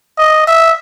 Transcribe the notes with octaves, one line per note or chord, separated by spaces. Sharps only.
D#5
E5